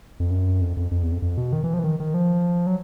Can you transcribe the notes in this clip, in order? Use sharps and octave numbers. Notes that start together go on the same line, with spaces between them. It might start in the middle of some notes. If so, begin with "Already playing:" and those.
F2
F#2
F2
F2
F2
E2
F2
F2
B2
D#3
E3
F3
E3
D#3
D#3
F3
F#3